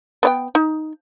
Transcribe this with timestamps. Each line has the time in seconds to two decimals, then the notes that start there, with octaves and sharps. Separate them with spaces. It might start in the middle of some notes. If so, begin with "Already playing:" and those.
0.23 B3 D5 G5
0.55 D#4